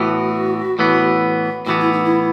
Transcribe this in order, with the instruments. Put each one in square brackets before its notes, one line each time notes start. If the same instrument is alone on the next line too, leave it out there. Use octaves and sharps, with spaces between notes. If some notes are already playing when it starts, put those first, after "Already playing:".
Already playing: [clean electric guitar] A2 E3 B3 [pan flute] F#4
[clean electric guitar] A2 E3 B3
[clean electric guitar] A2 E3 B3 [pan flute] F#4
[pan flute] E4
D#4
E4